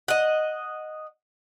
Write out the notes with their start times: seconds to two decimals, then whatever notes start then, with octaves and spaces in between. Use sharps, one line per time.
0.08 D#5 F#5